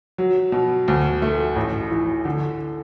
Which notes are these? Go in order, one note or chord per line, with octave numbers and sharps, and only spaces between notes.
F#3
B2
D2
A3
A1
E3
D3